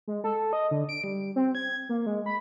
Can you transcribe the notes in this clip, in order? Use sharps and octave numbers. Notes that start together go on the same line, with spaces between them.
G#3
A4
D#5
D3
D7
G3
C4
G#6
A#3
G#3
B5